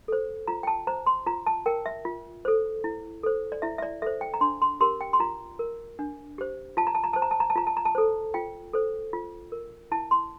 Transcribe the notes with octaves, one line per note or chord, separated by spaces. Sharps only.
A4 C5
F4 A#5
G5
A5
C5 A#5
C6
F4 A#5
A5
A#4 G5
E5
F4
A4 C5
E4
A4 C5
D5
E4 E5
E5
D5
A4 C5 E5
G5
A#5
D4 C6
C6
G4 A#4 C6
G5
C6
F4 A#5
A#4
D4
G4 C5
F4 A5
A#5
A5
A#5
C5 A5
A#5
A5
A#5
A5
F4 A#5
A5
A#5
A5
A4 C5
F4 G5
A4 C5
F4
A#4
E4 A5
C6